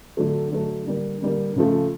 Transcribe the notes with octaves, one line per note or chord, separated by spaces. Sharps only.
D3 F#3 A3
D3 F#3 A3
D3 G3 A#3
D3 G3 A#3
C#3 F3 A3